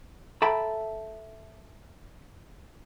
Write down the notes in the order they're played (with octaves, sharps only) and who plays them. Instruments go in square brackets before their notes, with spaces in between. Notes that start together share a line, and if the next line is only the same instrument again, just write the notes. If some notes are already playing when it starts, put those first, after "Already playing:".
[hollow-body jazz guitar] A4 E5 G5 A#5 B5